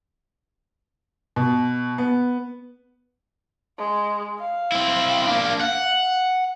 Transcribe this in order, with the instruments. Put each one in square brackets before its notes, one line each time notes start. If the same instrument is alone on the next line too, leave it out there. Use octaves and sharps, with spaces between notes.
[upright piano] B2
B3
[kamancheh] G#3
F5
[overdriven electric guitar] C4 E4
A#3 D4
F#5